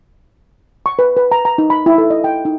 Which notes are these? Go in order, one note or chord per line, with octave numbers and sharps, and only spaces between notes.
C#6
B4
B4
A#5
A#5
D#4
B5
E4
A4
D#5
G5
D#4